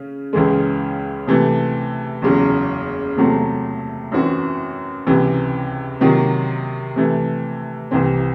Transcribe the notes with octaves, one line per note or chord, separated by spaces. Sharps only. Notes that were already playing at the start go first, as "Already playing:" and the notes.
Already playing: C#3 C#4
C#2 C#3 E3 G#3
C3 E3 A3
F#1 E2 C#3 F#3
E2 C3 F#3 A3 C4
F#2 E3 C4 F#4
C#2 C3 E3
C3 D#3 F#3
C3 E3 A3
C2 C3 E3 C4